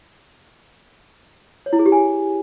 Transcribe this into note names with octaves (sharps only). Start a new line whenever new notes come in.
C#5
E4
G#4
G4
G#5